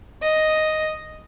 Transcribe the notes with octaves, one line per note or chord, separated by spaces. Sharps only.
D#5